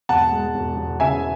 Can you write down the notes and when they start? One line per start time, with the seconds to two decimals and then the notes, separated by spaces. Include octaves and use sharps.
0.09 E1 F#5 A5
0.32 G#3
0.55 E1
0.77 E1
1.00 C#3 E5 G#5